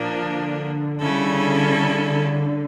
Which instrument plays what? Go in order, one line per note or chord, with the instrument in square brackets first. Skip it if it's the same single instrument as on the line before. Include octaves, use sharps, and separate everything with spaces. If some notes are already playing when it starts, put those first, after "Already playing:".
Already playing: [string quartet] A#2 F3 A#3 D4
[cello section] D3
[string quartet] C#3 G3 C#4 E4 A4